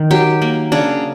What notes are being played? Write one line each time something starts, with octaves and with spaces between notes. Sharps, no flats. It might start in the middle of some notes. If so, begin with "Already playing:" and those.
Already playing: D#3
F#3 G4
A#3
C#3 D4